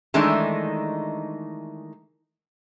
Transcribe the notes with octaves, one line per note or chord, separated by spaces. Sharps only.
D#3 E3 G#3 A3 D4 D#4